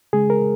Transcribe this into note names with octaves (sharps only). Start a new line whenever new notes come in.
C#3 G#3 G#4
A#4